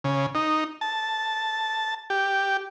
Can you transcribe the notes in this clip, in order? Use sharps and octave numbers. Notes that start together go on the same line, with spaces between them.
C#3
D#4
A5
G4